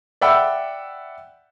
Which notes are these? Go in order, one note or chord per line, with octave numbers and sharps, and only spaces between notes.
D5 E5 F#5 G5 B5 E6